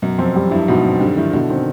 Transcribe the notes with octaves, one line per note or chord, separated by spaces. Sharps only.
F#2 B2
F2 C4
G3
G2 E4
G#2 B2
C4
D3 G3
D#3 E4
B2 D3
D#3 C4